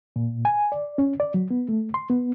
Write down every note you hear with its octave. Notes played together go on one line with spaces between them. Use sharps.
A#2
G#5
D5
C#4
D5
F#3
B3
A3
C6
B3